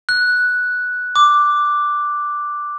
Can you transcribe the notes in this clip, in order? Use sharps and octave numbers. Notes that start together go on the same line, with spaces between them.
F#6
D6